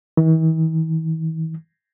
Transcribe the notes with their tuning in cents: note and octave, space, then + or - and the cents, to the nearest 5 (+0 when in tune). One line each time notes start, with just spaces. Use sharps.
E3 -45